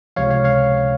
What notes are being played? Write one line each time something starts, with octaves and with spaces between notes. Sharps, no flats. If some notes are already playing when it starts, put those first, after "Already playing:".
C#2 C3 F3 C#5 F5
C#5 F5
C#5 F5